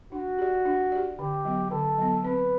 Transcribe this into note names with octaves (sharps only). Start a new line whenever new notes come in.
D4 F#4
G4 D5
D4
G4 D5
D3 G4
F#3 B3
D3 A4
F#3 B3
C4 B4